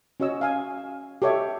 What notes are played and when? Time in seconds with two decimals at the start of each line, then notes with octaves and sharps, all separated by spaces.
0.20 C#4 F#4 C#5 D#5 E6
0.41 F5 G#5
0.77 F5
1.22 G4 A4 C#5 D#5 E5